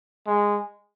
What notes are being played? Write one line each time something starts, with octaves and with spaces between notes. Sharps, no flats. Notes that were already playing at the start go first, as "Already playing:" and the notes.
G#3